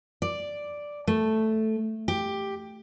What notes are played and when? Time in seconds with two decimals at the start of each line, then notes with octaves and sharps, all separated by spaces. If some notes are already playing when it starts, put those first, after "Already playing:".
0.22 D5
1.07 A3
2.08 G4